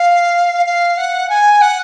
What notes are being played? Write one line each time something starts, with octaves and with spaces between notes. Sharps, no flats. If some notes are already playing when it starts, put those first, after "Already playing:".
Already playing: F5
F5
F#5
G#5
F#5